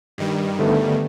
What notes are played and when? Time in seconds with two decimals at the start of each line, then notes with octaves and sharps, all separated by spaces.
0.18 G2 D#3 G3
0.59 D3 A3 B3